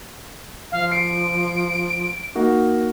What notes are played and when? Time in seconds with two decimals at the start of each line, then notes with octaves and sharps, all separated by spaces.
0.72 F3 F5
0.91 C7 D7
2.35 A#3 D#4 F#4